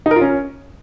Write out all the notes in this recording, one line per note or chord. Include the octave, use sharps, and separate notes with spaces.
D#4
A#4
F4
C#4